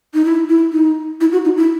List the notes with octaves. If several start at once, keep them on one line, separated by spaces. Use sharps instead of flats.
D#4
E4
E4
D#4
E4
F#4
D#4
E4